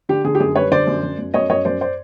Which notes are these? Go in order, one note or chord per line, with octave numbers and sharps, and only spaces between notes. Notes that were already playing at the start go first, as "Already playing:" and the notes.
D3 G4
D3 G#4
G4
F#2 G#4
G3 B4 C#5
D3 C5 D5
F#2
F#2
F#2
F#2 C#5 D#5
F#2 C#5 D#5
F#2 C5 D5
C5 D5